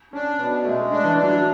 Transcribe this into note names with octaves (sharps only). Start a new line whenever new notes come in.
C#4 D4
B2 B3
G#3 A3
D4
E3
D4
F#3